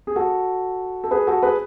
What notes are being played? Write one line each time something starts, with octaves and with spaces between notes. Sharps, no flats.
G#4
F#4 A4
A4
G#4 B4
F#4 A4
G#4 B4